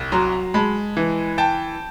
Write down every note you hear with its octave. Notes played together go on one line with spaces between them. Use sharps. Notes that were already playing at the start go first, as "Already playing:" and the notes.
Already playing: C2
F#3 A#5 C6
G#3 A5 B5
E3
G5 A5